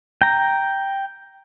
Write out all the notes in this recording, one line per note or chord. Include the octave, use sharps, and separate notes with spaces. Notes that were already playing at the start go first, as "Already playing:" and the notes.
G5 A#5